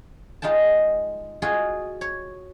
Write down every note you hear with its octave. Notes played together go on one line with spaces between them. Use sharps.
G#3 D#4 F4 G5 A5
F4 F#4 G#4 D#5
C#5